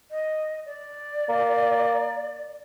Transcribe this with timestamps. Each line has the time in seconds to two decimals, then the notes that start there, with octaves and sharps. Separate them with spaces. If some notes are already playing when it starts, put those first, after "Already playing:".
0.11 D#5
0.66 D5
1.29 A#3